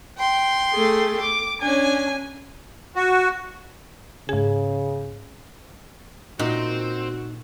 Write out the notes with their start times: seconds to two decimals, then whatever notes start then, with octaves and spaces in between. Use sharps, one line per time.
0.17 G5 C6
0.73 A3 G#4
1.21 D6
1.62 C#4 D4 G#5
2.96 F#4
4.29 G#2 C#3 G#4
6.39 A#2 C4 D#4 F#4